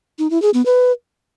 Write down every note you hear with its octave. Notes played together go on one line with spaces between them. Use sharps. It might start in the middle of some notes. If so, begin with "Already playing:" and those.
D#4
E4
G#4
B3
B4